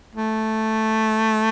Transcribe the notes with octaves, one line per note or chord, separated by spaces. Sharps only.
A3